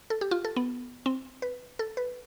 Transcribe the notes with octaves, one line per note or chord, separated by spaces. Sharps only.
A4
G4
F4
A4
B3
C4
B4
A4
B4